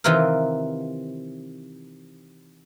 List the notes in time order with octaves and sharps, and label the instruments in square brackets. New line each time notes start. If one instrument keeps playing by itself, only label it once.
[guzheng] C3 D#3 E3 F4 G4 A#4